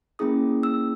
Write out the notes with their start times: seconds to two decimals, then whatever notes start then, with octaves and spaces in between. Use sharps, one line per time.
0.19 A#3 C#4 E4 G#4 D#6
0.63 E6